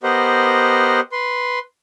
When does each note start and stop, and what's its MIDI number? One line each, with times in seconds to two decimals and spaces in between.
0.03 1.00 59
0.03 1.00 67
0.03 1.00 70
0.03 1.00 72
0.03 1.00 75
0.03 1.00 78
1.12 1.59 71
1.12 1.59 84